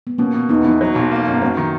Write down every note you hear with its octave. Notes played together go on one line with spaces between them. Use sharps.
B3
B2 A#3 C#4
B2
E2 B3 D#4
E3 B3 D#4
F#3
B1
A#3
F#2 B3
F#3 A#3 C#4
D#3